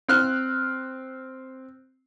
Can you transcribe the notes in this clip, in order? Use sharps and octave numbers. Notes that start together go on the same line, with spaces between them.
C4 F6 F#6